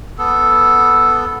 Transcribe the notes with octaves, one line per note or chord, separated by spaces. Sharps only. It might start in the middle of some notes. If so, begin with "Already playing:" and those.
B3 A4